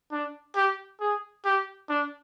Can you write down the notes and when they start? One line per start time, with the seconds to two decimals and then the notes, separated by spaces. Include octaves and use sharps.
0.12 D4
0.56 G4
1.00 G#4
1.45 G4
1.89 D4